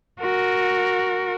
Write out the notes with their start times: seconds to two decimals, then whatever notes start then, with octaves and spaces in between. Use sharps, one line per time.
0.21 F#4 A#4